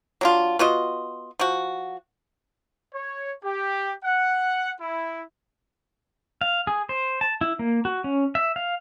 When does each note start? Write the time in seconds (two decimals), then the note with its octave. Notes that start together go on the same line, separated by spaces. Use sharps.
0.21 F#3 D4 F4
0.59 B3 F4 F#4 D#5
1.39 F3 F#4
2.94 C#5
3.44 G4
4.05 F#5
4.81 E4
6.41 F5
6.67 G#4
6.89 C5
7.21 A5
7.41 E4
7.59 A#3
7.85 F#4
8.04 C#4
8.35 E5
8.56 F5